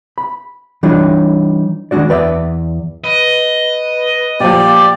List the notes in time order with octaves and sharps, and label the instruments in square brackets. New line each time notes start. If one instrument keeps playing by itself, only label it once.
[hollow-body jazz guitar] B5
E3 G3 D4 D#4 F4 C#5
D#3 G#3 D4 F#4 D5
E2 B4 D5 E5
[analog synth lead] B4 [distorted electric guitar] D#5
[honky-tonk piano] A#2 F3 [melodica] G4 D5